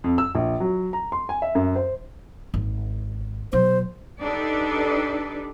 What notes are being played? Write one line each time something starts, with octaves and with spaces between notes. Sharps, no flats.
F2
E6
A#1
F#3
A#5
C6
G#5
E5
F#2
C5
G#1
B2 F#3 C5
D4 D#4 G4 A4 B4 D5